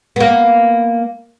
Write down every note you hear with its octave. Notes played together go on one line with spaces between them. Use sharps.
A#3 B3